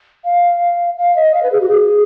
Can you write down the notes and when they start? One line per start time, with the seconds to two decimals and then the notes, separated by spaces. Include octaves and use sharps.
0.25 F5
0.98 F5
1.16 D#5
1.34 F5
1.43 B4
1.52 G#4
1.61 F#4
1.70 G#4